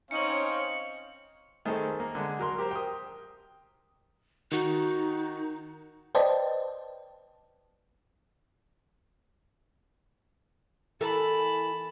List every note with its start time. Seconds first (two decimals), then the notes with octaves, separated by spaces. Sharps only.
0.11 C4 C#4 D#4 C#5 F5 C#7 F#7
1.65 D#3 A3 C4 G#4 A4
2.00 A#3
2.15 D3 G#3
2.39 F#3 A#4 C6
2.58 G4 A#4 C5
2.71 G5 D#6
4.51 D#3 D#4 F#4
6.15 B4 C5 D5 D#5 G5 A5
11.01 E3 A4 A#4 A5 B5